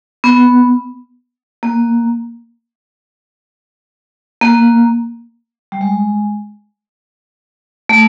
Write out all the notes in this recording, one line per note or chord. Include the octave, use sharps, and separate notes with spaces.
B3
A#3
A#3
G3
G#3
A3